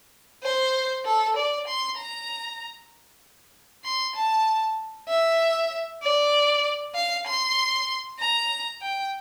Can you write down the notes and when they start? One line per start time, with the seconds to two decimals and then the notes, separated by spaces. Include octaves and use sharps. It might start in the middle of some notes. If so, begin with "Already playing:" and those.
0.44 C5
1.06 A4
1.37 D5
1.68 C6
1.98 A#5
3.85 C6
4.16 A5
5.09 E5
6.03 D5
6.95 F5
7.27 C6
8.20 A#5
8.82 G5